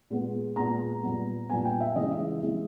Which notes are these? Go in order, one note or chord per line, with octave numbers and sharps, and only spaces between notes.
A#2 G#3 B3
A#2 G#3 B3 A#5
A#2 G3 B3
A#2 G3 B3 G#5
G5
E5
C#3 E3 G#3 D#5
E5
C#3 E3 G#3